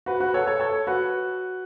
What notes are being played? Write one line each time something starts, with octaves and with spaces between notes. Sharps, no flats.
F#4 B4
F#4 B4
A4 C#5
A4 C#5
A4 C#5
F#4 B4